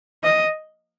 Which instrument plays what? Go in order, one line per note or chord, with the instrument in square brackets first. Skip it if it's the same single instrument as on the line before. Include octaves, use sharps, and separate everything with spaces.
[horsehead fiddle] D#5